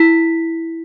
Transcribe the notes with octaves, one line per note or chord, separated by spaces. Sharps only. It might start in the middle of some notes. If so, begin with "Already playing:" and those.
Already playing: E4 B6